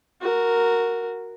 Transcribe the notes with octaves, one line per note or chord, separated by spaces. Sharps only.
F#4 A#4